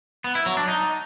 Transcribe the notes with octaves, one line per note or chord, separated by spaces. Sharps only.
B3
E4
F#3
D4
D#4